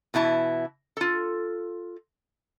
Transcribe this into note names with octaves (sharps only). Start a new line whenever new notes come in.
B2 E3 E4 A5
F4 A4